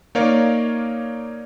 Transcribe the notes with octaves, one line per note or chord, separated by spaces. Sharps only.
A#3 D#4 A#4 C#5 D5 F5